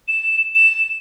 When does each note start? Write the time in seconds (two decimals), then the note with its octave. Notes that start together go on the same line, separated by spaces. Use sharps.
0.08 E7
0.55 E7